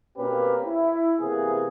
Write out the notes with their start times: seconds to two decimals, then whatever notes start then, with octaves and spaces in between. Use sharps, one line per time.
0.17 B2 A#3 C4 C#4 G4 B4
0.66 E4
1.20 C3 E3 A#3 B3 G#4